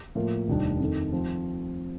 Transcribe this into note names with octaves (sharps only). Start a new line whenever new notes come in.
A2 F3 A#3 F4 A#4
F1 D#2 D#3 G3 D4
F2 D#3 A3 D#4
F3 C4